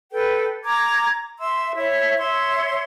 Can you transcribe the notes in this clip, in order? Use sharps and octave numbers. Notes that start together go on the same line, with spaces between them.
A4 B4 G5
A#5 D6 G#6
E5 C6 E6
E4 C#5 E5
C#5 E5 C6